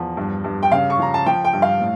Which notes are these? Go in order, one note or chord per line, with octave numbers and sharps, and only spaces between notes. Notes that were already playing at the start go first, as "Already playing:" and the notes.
Already playing: E2 F3
G2
G2
G5
C#3 F5
C#6
F3 A#5
A5
F3 G5
G5
G2
F5
A2